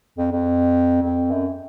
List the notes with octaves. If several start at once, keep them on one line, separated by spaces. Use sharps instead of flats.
F2
F2
F2
F#2